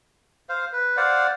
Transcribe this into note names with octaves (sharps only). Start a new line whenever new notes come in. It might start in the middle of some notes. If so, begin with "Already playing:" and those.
C5 F5
B4
C5 D5 F5 F#5